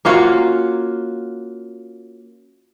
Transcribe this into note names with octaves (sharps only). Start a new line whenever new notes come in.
A#3 C#4 F4 F#4